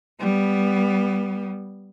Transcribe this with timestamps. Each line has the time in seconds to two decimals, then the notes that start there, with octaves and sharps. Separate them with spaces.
0.20 G3 B3